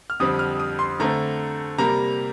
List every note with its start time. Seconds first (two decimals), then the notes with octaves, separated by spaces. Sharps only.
0.10 F6
0.20 F2 D3 G3 C4 D#6
0.39 F6
0.59 D#6
0.79 C6
1.00 D3 A3 C4 A#5
1.78 C3 G3 A#3 A#5